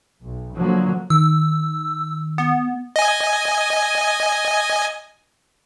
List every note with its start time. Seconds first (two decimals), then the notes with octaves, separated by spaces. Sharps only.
0.23 B1
0.56 D3 F3 F#3 A#3
1.10 D#3 E6
2.38 B3
2.96 D#5 G#5